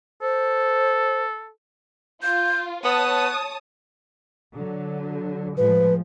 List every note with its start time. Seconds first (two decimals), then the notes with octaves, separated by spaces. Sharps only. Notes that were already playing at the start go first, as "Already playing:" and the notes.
0.22 A4 C5
2.23 F4 G6
2.84 B3 C#5 A5 D#6 F#6
4.57 D3 F#3
5.57 A2 F3 G#3 B4